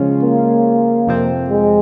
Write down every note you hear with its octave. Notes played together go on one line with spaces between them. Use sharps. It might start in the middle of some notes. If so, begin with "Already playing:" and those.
Already playing: C#3 F3 G#3 C#4 F4
A#3
F2 C3 F3 C4
G#3